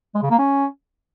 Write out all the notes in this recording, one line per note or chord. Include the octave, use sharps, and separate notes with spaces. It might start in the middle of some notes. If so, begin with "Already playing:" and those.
G#3
C#3
A#3
C#4